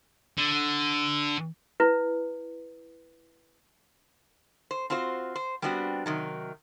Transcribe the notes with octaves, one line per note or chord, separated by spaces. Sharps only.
D3
E4 B4
C5
C4 F4 F#4 C5
C5
G3 B3 C4 D4 F#4
C3 D#3 F#3